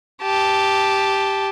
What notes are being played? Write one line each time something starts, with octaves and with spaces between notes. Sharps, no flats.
G4 A5